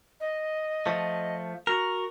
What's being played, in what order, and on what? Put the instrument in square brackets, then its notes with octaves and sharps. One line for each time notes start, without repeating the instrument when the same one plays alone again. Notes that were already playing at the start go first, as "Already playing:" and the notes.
[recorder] D#5
[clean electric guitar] F3 A3
[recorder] F#4 [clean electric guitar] A#4